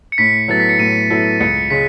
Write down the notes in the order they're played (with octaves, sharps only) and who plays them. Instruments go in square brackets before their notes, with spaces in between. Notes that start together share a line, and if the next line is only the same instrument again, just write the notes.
[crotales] C#7
[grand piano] A2 [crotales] B6
[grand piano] F#3 B3 E4 A4 [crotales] A6
[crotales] B6
C#7
[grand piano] A2 [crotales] D#7
[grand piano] F#3 B3 E4 A4
[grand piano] C#2 [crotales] C#7
[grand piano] C#3 G#3 [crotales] B6